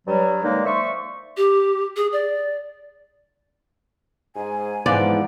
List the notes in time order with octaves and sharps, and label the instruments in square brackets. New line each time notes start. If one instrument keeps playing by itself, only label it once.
[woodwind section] G2 F#3 G3
D3 D#3 G#3 A#3 D#4
C5 D5 E5 C#6
[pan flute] G4
G#4
D5
[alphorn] G#2 [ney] G#5
[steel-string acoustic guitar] G#2 E3 F3 [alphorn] B3 [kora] D5